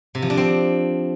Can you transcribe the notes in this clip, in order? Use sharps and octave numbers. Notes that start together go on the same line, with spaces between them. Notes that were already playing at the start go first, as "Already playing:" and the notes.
C3
F3
D4
C4